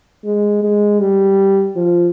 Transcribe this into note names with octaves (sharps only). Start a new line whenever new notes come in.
G#3
G#3
G3
F3